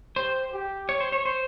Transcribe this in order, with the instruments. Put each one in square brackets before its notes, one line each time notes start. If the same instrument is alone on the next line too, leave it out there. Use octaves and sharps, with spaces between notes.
[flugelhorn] G4 [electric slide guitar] C5
[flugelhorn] G4
[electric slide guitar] C#5
C5
C#5
C5